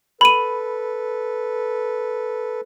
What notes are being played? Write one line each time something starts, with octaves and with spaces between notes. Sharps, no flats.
A4 B4 B5 D#7